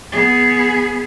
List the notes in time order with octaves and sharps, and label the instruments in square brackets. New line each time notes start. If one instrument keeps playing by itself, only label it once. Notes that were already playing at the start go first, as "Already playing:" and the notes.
[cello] B3 G#4